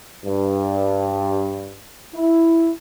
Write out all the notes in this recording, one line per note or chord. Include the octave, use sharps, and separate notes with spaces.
G2
E4